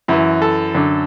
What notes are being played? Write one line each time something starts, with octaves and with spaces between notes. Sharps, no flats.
F#2 E3 E4
A4
F#2 D3